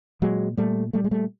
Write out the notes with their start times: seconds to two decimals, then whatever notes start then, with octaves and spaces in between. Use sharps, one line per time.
0.22 A#2 F#3 G#3
0.57 A#2 G3 A3
0.93 A#2 G3 A3
1.04 G#3
1.11 G3 A3